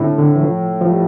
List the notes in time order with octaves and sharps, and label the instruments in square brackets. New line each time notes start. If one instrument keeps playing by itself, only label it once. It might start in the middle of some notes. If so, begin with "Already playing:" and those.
Already playing: [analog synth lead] A2 [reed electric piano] D3 A3 C4 D4
[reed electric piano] D3
E3
F3
F3
G3